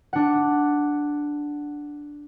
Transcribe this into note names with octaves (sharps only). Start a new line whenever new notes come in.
D4 F#5